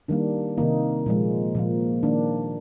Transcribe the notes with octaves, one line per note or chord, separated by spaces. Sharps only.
D#3 G3 A#3 D4
C3 D#3 A#3 D#4
A#2 F3 G#3
A#2 F3 A#3
D#3 A#3 D4